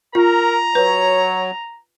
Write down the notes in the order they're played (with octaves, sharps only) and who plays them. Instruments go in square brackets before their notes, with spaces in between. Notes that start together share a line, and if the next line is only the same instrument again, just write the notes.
[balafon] F4 [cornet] A#4 [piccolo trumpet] A#5
[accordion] F#3 [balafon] B4 [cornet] C#5